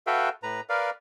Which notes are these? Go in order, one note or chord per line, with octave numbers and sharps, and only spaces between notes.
F#4 A4 B4 E5 F5 G5
A2 B4 A#5
A#4 B4 D5 F5